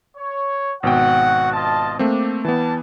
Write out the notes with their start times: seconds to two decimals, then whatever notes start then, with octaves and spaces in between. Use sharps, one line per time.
0.16 C#5
0.83 G#1 B2 F#4 F#5 G5
1.53 F4 D#5 A5
1.99 A3 A#3 C4 D4
2.45 E3 G3 B3 A5